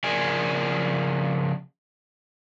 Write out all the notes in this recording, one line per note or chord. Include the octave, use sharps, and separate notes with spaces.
C#3 F3 G#4 A#4 D5 G#5